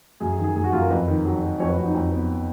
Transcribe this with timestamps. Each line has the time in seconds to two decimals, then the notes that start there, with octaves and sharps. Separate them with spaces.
0.20 F#2 G#4
0.32 G#4
0.38 D#3
0.44 G#4
0.56 F#2 G#4
0.64 F#4
0.72 F#2 F4
0.81 A#4
0.90 F2 B4
1.08 D#3
1.25 F#3
1.42 F#3
1.60 F2 C#5
1.69 B4
1.77 F2 F#4
1.86 D#4
1.95 F2
2.12 B3